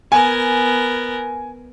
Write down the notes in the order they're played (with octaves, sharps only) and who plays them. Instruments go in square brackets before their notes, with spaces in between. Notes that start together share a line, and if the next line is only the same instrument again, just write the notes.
[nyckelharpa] B3 A#4 [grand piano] G#5